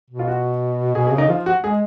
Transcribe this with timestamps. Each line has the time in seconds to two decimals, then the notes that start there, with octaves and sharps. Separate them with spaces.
0.11 B2
0.19 F4
0.28 F#4
0.95 B2 G#4
1.07 G#4
1.12 C#3
1.18 D#4
1.29 F3 F4
1.46 F#4
1.63 G#3 G#4